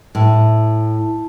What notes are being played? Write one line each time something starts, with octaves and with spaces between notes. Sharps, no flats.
A2